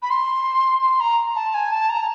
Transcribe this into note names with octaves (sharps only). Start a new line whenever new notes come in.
B5
C6
C6
A#5
A5
G#5
A5
A#5